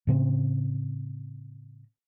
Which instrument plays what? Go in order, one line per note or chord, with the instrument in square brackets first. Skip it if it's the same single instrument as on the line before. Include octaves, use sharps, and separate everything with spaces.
[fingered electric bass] A2 C#3 C4